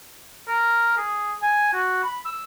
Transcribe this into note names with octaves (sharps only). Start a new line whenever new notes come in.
A#4
G#4
G#5
F#4
B5
E6